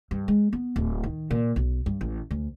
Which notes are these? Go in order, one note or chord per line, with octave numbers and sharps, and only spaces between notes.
G2
G#3
B3
D1
D#3
A#2
B1
G2
A1
D2